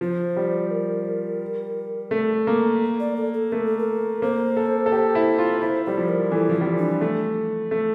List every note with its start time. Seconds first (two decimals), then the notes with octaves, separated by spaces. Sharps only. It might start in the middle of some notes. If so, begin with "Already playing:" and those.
0.01 F3 C5
0.36 G3
0.71 A#4
2.11 A3
2.47 A#3
3.00 D5
3.16 A4
3.33 A4
3.52 A3 A#4
3.65 A4
3.78 A#4
4.22 A#3 C5
4.57 A4
4.86 A4
4.92 G4 C5
5.15 E4
5.38 F4
5.61 E4 C5
5.85 G3 C5
5.97 F3
6.09 A#4
6.32 E3 A4
6.49 F3
6.61 G3
6.66 F3
6.78 D4
7.01 A3
7.71 A3